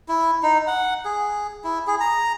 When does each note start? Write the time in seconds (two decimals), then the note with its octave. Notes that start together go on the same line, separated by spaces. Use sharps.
0.08 E4
0.43 D#4
0.67 F#5
1.05 G#4
1.64 E4
1.87 G#4
2.00 A#5